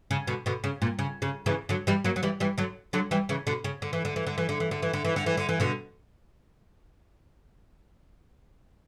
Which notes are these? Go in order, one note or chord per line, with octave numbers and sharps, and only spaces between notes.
C#3
B2 D3
B2 D3
C#3
A#2
C#3
C#3
C#3 E3
D3 F#3
E3 G3
F#3 A#3
F#3
E3 G3
E3 G3
D3 F#3
D3 F#3
E3 G3
C#3 E3
B2 D3
C#3
D3
E3
D3
E3
D3
E3
D3
E3
D3
E3
D3
E3
D3
E3
D3
E3
B2 D3